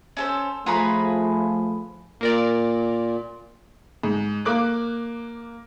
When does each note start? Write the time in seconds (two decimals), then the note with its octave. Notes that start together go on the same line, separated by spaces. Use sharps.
0.17 C#4 A4 C5
0.66 F3 A3 F4 G#4 B4 A#5 B5 C#6
2.21 A#2 A#3 A#4 D5
4.03 G#2
4.45 A#3 D6 F#6